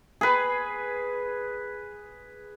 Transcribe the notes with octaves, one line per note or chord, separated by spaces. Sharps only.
G#4 B4